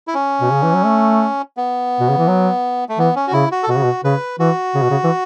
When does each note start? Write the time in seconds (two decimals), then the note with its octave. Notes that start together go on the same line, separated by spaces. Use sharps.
0.08 E4
0.14 C#4
0.41 B2
0.52 C#3
0.63 E3
0.74 F#3
0.85 A3
1.57 B3
2.00 B2
2.09 C#3
2.18 E3
2.28 F#3
2.89 A3
2.98 E3 B3
3.16 C#4
3.28 F#4
3.33 C#3 E4
3.52 F#4
3.63 A4
3.69 B2 F#4
3.77 C#3
3.84 B2
4.04 C#3 B4
4.40 E3 F#4
4.75 C#3
4.82 B2
4.90 C#3
5.04 E3